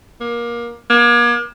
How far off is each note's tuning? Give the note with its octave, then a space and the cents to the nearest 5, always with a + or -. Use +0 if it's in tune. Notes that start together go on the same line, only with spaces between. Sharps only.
A#3 +25
A#3 +40